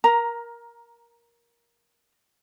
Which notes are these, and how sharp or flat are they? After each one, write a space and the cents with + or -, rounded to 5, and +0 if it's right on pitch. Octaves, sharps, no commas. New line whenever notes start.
A#4 +15 A#5 +0